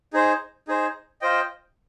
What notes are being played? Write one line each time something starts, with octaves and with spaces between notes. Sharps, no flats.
D#4 G#4 C5
D#4 G#4 C5
F4 C5 D#5 G5